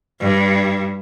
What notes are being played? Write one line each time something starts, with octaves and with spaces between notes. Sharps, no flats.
G2